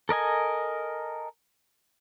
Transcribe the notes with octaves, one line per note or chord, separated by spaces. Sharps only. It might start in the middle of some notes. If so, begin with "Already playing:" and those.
A4 A#4 D#5 G#5